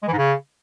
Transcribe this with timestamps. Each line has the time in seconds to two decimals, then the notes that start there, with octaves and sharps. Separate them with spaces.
0.03 G#3
0.08 E3
0.13 G#2
0.18 C#3